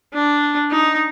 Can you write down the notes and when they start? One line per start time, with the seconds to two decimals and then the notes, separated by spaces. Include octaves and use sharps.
0.13 D4
0.71 D#4